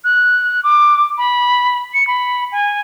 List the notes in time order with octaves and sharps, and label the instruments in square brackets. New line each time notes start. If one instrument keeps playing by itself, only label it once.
[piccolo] F#6
D6
B5
C#7
B5
G#5